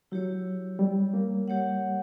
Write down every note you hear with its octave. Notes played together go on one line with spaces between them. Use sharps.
F#3 E4 G4 C#5
G3
A#3
G4 C#5 F#5